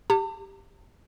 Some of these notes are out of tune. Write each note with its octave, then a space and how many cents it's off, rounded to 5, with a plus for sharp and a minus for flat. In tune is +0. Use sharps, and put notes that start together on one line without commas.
G4 +0 A5 +40